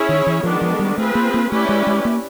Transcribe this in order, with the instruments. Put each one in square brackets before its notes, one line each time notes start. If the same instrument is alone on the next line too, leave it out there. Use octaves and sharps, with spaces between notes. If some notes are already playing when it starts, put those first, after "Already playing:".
Already playing: [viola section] C#4 E4 G#4 C#5
[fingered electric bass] D#3
E3
[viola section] D#3 G#3 B3 D4 [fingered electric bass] F3
[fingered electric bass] F3
G3
[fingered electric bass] A3 [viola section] C4 F4 G#4 B4
[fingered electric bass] A#3
A#3
[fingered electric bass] A3 [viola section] C#4 E4 G4 B4 D5
[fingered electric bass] G#3
G#3
A#3